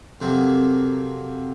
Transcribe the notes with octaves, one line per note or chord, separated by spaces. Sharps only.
F2 C3 F#3 A#3 C4